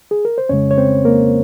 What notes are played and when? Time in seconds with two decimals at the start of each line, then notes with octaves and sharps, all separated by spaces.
0.11 G#4
0.25 A#4
0.38 C5
0.49 F2 C#3 G#3 C#4 C#5
0.71 C#5
0.78 C4 C5
1.05 A#3 A#4